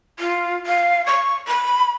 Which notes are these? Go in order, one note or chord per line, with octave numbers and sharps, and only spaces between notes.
F4
F5
C#6
B5